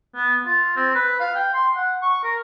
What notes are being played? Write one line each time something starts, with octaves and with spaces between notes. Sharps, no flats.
B3
F4
C4
B4
F5
G5
C6
F#5
C#6
A#4